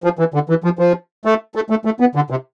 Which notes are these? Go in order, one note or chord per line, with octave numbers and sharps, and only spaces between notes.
F3
E3
D3
E3
F3
F3
A3
A3
A3
A3
B3
D3
C3